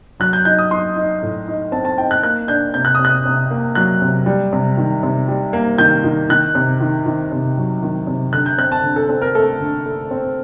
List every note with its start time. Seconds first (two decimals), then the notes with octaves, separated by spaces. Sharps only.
0.20 F#3 F#6
0.33 G6
0.45 D#4 G6
0.59 D#6
0.71 D#4 C6
0.96 D#4
1.22 A2
1.48 D#4
1.72 C4 A5
1.85 A5
1.98 D#4 G5
2.11 F#6
2.23 A#3 F#6
2.48 D4 G6
2.74 C3 G6
2.85 F#6
2.95 C3 D#6
3.05 F#6
3.26 C3
3.51 A#3
3.75 F#3 F#6
4.02 C3
4.26 G3
4.53 C3
4.77 D#3
5.03 C3
5.28 G3
5.53 A#3
5.78 D#3 G6
6.04 D#3
6.30 D#3 F#6
6.55 C3
6.81 D#3
7.06 D#3
7.32 C3
7.57 F#3
7.83 D#3
8.07 C3
8.33 D3 F#6
8.46 G6
8.58 C4 F#6
8.72 A5
8.83 D3
8.96 A4
9.09 C4 A4
9.22 A#4
9.35 A3 A4
9.60 D3
9.86 A3
10.11 C4